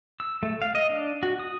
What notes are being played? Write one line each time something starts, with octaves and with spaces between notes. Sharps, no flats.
E6
A3
F5
D#5
D4
F#4
D#6